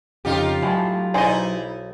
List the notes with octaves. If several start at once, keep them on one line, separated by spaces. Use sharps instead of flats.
F2 C#3 D#4 F4 G4
A2 F#3 G#3 A4
B1 D#4 E4 G#4 C5 D5 D#5